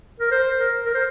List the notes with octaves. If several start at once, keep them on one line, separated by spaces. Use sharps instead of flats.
A#4
C5
A#4
A#4
C5